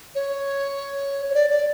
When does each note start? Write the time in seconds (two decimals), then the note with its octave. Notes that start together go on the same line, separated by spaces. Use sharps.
0.15 C#5
1.30 C#5
1.34 D5
1.50 D5